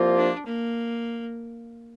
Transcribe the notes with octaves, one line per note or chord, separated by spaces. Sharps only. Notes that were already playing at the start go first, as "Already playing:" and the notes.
Already playing: C2 C3 F3 A#3 F4
D4
A#3